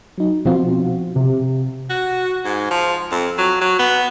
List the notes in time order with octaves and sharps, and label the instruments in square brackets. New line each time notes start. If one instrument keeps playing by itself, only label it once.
[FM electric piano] F#3 D#4
B2 F3 C4 F4 F#4
[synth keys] C3
[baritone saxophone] F#4
G#2
F3
F2
F#3
F#3
B3